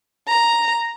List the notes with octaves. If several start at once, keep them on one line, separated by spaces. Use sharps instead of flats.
A#5